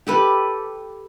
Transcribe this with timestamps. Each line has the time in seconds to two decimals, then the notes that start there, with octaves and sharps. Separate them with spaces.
0.07 G4 A4 B4